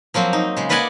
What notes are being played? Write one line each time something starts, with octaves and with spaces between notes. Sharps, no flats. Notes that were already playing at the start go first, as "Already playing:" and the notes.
F3 F#3 A#3 C4
D#4
C#3 G#3
A#3 B4 D5 D#5 F#5 G#5